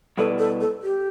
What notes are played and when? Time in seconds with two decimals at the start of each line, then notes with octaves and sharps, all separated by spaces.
0.18 B2 G3 E4 A4 B4 D5
0.39 A4
0.61 A4
0.83 G4